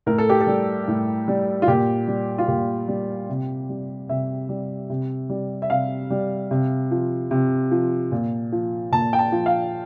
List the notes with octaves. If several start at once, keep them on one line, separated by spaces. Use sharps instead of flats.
A2 A#4
A4
G4
A4
G3
A2
G3
F4
A#2 G4
G3
F4
A#2 G4
G3
C3
G3
C3 E5
G3
C3
G3
E5
C3 F5
G3
C3
F3
C3
F3
A#2
F3
A#2 A5
G5
A5
F3
F5